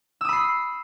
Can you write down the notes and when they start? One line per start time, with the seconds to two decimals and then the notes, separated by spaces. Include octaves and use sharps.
0.21 E6
0.25 D#6
0.29 B5
0.33 C7